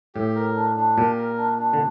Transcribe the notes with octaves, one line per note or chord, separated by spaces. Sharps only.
A2 G4
A#4
D4
D4
A#2 G4
A#4
D4
D4
D3